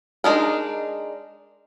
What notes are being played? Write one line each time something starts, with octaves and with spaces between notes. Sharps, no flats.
G#3 D4 D#4 A#4